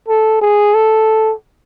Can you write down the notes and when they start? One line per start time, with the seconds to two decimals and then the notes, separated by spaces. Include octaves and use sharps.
0.08 A4
0.42 G#4
0.74 A4